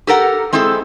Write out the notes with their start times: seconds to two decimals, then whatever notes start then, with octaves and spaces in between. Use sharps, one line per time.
0.07 G4 A4 A#4 F#5
0.53 G#3 C4 E4 G#4 A4